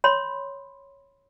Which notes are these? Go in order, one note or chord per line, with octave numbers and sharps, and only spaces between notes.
C#5 B5 C6